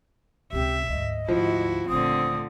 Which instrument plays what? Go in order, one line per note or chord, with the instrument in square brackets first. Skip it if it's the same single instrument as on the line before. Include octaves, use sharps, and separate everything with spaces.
[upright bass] C#2 C3 [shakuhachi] G4 [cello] E5
[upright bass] D2 G#2 [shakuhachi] D#5
[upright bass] D2 G#2 [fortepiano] F3 [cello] E4 F#4
[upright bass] D#1 A3 [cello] D3 C4 [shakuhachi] D#6